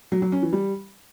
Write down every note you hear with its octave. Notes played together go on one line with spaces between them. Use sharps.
F#3
F#3
C#4
E3
G3